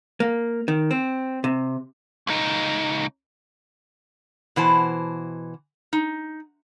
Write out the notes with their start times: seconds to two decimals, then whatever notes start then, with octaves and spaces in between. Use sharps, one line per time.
0.20 A#3
0.68 D#3
0.91 C4
1.44 C3
2.27 C#2 D#4
4.56 B2 E3 C5 A5
5.93 D#4